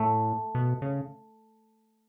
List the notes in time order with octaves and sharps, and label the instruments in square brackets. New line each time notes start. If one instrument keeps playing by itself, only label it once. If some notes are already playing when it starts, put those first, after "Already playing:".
Already playing: [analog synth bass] A2 [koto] A3
[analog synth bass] B2
C#3